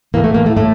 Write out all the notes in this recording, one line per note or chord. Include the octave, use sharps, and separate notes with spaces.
A2 E3 A#3
A3
A#3
A3
A2 A3